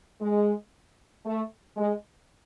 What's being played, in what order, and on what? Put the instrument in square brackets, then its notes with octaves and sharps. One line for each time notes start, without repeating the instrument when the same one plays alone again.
[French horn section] G#3
A3
G#3